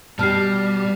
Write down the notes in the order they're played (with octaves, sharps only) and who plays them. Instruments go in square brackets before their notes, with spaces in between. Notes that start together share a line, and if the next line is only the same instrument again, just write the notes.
[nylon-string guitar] B2 G4 [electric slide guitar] G3 [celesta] A5 F6 C7